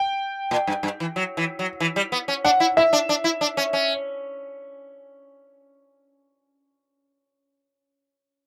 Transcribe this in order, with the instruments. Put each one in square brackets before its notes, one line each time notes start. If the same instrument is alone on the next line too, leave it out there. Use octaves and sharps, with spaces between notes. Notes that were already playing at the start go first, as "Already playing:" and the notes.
Already playing: [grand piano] G5
[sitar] A#2
G2
G2
E3
F#3
E3
F#3
E3
G3
B3
C#4
[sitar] D4 [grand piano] F#5
[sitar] E4
[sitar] E4 [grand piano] E5
[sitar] D4
D4
E4
D4
C#4
C#4